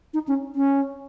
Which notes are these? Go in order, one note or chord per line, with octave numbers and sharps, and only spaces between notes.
D#4
C#4
C#4